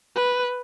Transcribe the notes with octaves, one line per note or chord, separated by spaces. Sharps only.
B4